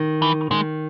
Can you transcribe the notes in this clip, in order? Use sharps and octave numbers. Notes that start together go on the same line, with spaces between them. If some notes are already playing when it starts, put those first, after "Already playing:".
Already playing: D#3
E3
D#3 G#3